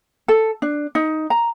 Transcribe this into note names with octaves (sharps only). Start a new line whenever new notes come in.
A4
D4
D#4
A#5